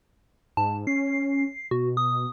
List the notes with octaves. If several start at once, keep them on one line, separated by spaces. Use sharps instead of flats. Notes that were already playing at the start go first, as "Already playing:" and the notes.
G#2 A5
C#4 C7
B2 F#4
D#6